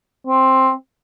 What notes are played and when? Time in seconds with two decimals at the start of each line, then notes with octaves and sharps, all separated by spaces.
0.27 C4